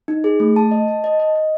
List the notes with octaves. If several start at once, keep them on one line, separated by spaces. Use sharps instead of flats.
D#4
G#4
A3
A5
D#5
A5
D#5
D#5
D#5